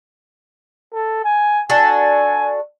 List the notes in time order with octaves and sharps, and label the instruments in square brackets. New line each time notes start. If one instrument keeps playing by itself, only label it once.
[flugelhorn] A4
G#5
[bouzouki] D4 F#4 A4 [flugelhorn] G#5